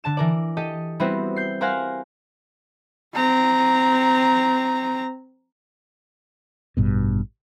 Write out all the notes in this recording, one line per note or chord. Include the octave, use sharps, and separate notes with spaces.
D3 A5 E7
E3 A#4 D5
G4 A4 D#5
G3 B3 C4 E4 F#4 G4
G6 C7
G4 A#4 C5 F5 F#5 G#5
C4 A#5
A1 G2 B2